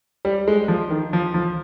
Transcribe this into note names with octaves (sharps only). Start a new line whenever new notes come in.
G3
G#3
F3
D#3
F3
F3